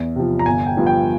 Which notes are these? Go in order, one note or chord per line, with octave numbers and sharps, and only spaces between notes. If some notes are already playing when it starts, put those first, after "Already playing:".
Already playing: E2
C3 F3
A#5
G1 G#5
G5
G2 F3
G5